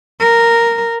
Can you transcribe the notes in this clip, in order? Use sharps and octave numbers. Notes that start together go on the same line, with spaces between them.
A#4